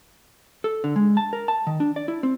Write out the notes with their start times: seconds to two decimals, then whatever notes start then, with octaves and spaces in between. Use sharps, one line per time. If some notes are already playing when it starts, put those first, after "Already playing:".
0.64 A4
0.84 D3
0.96 G#3
1.17 A5
1.33 A#4
1.48 A5
1.67 D#3
1.80 D4
1.96 D5
2.08 E4
2.23 C4